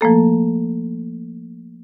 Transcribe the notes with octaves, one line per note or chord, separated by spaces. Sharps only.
F3 A3 A#3 A4